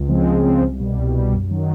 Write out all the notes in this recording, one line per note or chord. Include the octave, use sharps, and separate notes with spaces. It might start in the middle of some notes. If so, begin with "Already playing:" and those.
Already playing: C#2
C#3 F3 G#3 C4
C#2
C#3 F3 G#3 C4
C2
B2 G3
C2
B2 G3
F#2
D#3 F#3